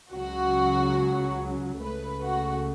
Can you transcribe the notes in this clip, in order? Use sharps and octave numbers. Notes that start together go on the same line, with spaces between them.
C#2 C#3 F#3 F#4
C#2 C#3 A3 B4
F#4